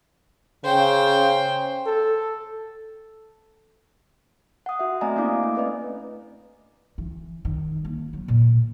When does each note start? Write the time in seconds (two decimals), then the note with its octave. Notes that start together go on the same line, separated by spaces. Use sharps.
0.64 C#3 C5 G5
1.86 A4
4.66 F#5 D#6
4.79 F#4 E5
5.01 A3 C4 D5 D#5 G#5 A#5
5.16 A#3 C#4 D4 E4 F5 D6
5.43 A3
5.55 A3 C4 B4 D5 D#5
6.98 E3
7.45 D#3
7.85 A#3
8.13 F#3
8.28 A#2